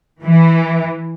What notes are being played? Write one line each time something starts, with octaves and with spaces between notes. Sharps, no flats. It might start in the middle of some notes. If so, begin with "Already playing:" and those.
E3